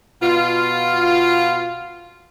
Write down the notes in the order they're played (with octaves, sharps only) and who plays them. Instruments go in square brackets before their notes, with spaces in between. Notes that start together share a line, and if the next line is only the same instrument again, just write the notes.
[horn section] B2 F4